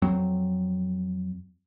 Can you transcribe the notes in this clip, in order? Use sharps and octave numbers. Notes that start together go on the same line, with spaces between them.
F2 F#3 C4